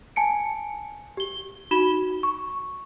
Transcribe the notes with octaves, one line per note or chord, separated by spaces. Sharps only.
G#5 A5 C#7 D7
G4 G7
D#4 F#4 B5 E7 G7
C#6